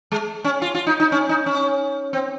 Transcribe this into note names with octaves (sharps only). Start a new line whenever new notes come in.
G#3
C#4
F4
F4
D#4
D#4
C#4
D#4
C#4
C4